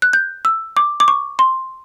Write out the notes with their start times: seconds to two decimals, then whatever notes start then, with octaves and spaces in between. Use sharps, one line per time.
0.02 F#6
0.13 G6
0.45 E6
0.77 D6
1.00 D6
1.08 C#6
1.39 C6